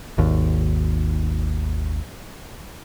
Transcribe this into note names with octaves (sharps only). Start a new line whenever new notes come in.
G#1 D#2